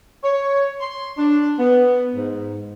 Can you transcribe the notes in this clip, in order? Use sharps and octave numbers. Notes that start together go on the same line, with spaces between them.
C#5
C6
D4
B3
G#2